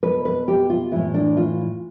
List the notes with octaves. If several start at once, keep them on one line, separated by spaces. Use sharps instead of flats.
B2 B4
B4
G4
F4
A2 E3 E4
D4
F4